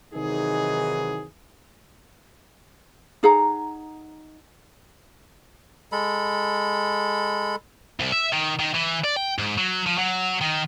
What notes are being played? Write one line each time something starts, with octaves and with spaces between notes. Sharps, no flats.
C3 D#3 E3 F#3 D#4 G#4
D#4 G#4 F#5 A#5
G#3 A4 B5
C2
E5
D#3
D#3
E3
D5
G5
G#2
F#3
F3
F#3
D#3